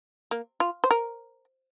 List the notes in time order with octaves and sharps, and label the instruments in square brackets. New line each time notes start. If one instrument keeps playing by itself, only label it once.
[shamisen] A#3
F4
C5
A#4